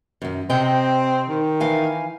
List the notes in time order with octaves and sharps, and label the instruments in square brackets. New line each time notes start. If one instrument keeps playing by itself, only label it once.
[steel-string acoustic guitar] F#2 D#3
[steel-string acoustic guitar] C3 D#5 G5 [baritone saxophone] C4
[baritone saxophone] D#3
[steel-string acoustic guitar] E3 F5 G#5